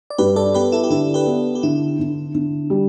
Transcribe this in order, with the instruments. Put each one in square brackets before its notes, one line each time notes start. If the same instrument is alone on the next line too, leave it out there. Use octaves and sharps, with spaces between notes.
[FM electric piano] D5
[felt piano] G2 [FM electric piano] G4 B4
[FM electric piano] A4 D5
[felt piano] B3 [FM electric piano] G4 B4
[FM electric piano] E4 A4
G4
[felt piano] D3 [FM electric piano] E4 A4
[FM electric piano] G4 B4
[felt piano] B3
[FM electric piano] G4
[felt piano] D3 [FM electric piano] E4
[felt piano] D3
D3
G3